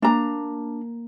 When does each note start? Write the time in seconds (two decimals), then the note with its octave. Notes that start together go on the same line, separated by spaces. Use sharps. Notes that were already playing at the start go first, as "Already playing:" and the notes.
0.02 A#3 D4 A#5